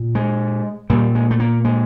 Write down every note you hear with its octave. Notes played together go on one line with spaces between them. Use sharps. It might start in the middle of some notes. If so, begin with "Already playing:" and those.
Already playing: A#2
G#3
A#2 G3
G#3
A3
A#3
G#3